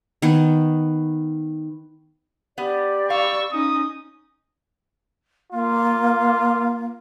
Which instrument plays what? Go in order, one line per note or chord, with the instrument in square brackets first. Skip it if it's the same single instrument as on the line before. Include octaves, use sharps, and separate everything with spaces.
[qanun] D#3 B3
[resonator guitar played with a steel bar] B3 [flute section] G4 D5 B5
[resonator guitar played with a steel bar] F5 [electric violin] C#6 E6
[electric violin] C#4 D#4 [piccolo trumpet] D#6
[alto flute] A#3 [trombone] F4